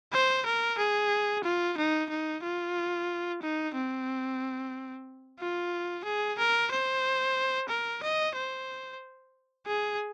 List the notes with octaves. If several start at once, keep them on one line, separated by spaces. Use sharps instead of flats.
C5
A#4
G#4
F4
D#4
D#4
F4
D#4
C4
F4
G#4
A#4
C5
A#4
D#5
C5
G#4